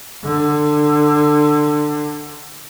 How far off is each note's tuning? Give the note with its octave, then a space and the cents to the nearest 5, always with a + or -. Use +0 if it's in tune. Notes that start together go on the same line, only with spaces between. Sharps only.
D3 +20